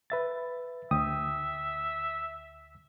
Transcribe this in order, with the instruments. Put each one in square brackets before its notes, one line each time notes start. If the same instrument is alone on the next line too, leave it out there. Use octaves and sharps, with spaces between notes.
[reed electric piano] B4 E5 A6
[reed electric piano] D2 G5 D#6 [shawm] E5